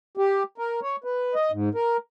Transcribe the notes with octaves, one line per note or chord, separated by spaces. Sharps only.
G4
A#4
C#5
B4
D#5
G#2
A#4